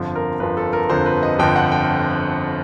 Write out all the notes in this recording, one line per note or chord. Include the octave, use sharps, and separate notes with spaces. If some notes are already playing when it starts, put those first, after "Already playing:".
Already playing: G1 F2 D3 F3
A#4
G1 F2 D3 F3 B4
A4
A#4
G1 F2 D3 F3 C5
B4
D#5
G1 F2 D3 F3 G5
F#5
G5